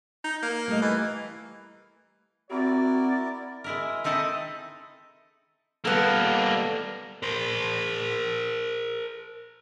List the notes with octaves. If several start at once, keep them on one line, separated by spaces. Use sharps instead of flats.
D#4
A#3
G3 A3 D#5
E3
C4 E4 F#4 A#4 D5
G#3 E4 A#4
C4 D#4 E4 A4 D#5
G3 A#3 B3 A4
A#4 C5